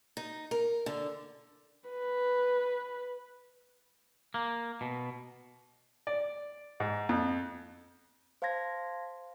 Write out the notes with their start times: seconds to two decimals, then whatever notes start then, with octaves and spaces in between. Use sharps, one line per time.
0.17 D#4
0.51 A#4
0.86 D3
1.89 B4
4.34 A#3
4.81 B2
6.07 D5
6.80 G#2
7.09 F2
8.42 C5 F5 A5 C6 G#6 A#6